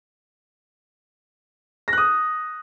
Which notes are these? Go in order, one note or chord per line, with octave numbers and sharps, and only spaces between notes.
D#6 F#6 A#6